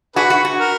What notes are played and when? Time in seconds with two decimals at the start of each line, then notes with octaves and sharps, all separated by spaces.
0.16 D4 F#4 G#4 B4
0.30 F#4
0.45 F#4
0.59 A#4